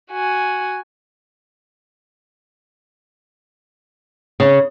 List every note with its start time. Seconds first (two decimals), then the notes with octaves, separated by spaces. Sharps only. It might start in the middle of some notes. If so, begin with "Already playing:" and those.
0.12 F#4 G#5
4.40 C#3